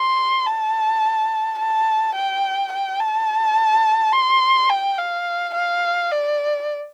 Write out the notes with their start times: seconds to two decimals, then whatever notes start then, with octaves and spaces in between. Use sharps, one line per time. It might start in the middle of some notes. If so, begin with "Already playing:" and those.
Already playing: C6
0.46 A5
1.59 A5
2.16 G5
2.73 G5
3.00 A5
4.13 C6
4.70 G5
4.98 F5
5.55 F5
6.11 D5